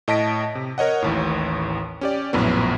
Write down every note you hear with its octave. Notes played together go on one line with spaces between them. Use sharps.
A2 D#5 A5 A#6 B6 D7
C3
A#4 C#5 D#5 F#5
A1 D#2 A2
C#4 G4 D5
A#1 F#2 A2 B3